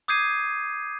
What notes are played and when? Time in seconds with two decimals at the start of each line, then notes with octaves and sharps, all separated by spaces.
0.08 D6 D#6 G6 G#6 C7 D#7